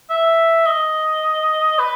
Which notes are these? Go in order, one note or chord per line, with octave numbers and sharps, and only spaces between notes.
E5
D#5
B4